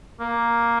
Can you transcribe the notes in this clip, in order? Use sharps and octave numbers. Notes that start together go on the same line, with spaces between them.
A#3